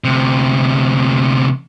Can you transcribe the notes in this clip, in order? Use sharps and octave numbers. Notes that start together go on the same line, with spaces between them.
D2 C3